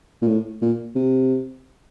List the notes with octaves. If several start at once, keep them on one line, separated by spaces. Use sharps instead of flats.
A#2
A2
A#2
C3